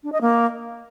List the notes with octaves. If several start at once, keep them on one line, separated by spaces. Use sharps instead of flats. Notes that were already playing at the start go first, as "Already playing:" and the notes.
D4
D#5
A#3